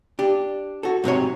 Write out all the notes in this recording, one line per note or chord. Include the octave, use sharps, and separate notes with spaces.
D4 G4
F#4 A4
G#2 C3 F#3 C#5